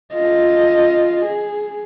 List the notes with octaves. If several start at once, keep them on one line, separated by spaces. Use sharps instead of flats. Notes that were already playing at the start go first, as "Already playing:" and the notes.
F4 D#5
G#4